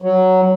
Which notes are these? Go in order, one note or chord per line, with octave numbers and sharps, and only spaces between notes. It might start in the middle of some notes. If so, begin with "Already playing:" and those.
F#3